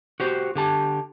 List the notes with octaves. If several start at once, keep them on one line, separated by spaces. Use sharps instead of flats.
F#4 G4 C5
D3 G4 A5